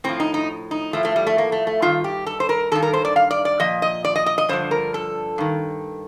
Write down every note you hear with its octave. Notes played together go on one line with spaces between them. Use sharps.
A2 F3 C4
D#4
D#4
D#4
A2 F3 A3
A3
G3
A3
A#3
A3
A3
G2 D#3 F4
G4
A4
C5
A#4
G2 D#3 A4
A#4
C5
D5
F5
D5
D5
A#2 F3 D#5
D#5
D5
D#5
D#5
D#5
G2 D3 F3 C5
A#4
A4
G2 D#3